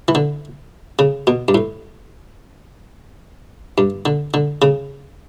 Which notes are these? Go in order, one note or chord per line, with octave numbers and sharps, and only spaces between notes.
E3
D3
C#3
B2
G2
A2
G2
D3
D3
C#3